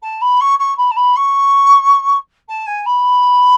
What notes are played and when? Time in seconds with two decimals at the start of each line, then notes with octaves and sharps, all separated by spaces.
0.02 A5
0.21 B5
0.40 C#6
0.59 C#6
0.77 B5
0.91 A5
0.96 B5
1.16 C#6
2.48 A5
2.66 G#5
2.85 B5